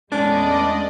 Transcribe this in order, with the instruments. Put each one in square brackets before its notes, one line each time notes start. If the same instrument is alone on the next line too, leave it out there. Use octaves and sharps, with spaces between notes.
[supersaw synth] E2 D5 D#5 [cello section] G#3 [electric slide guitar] A3 C#4 G#5 [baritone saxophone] D4